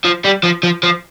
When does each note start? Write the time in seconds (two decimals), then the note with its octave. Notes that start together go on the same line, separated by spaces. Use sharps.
0.04 F3
0.24 G3
0.43 F3
0.63 F3
0.83 F3